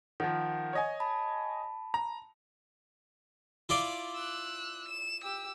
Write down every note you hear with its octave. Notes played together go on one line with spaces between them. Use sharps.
D#3 F3 F#5
C#5 D#5 G#5
A5 B5
A#5
E4 F4 D5
E6 F#6
E7
G4 E6